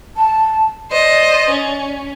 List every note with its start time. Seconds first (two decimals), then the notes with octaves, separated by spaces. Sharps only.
0.16 A5
0.91 C5 D5 D#5
1.49 C#4